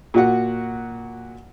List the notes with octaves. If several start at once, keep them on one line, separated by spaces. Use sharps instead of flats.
A#2 F#4 F#5